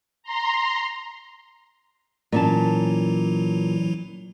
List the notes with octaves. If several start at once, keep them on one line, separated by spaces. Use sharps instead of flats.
A#5 C6
A#2 E3 F#3 C#4 E4 A5